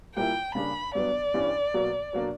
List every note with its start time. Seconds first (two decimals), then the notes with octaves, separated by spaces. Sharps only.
0.16 A#2 G3 A#3 E4 G5
0.55 C#3 G3 A#3 D4 B5
0.94 G2 F#3 B3 D5
1.34 G2 E3 G3 C#4
1.74 B2 F#3 A#3
2.13 B2 F#3 A#3 D4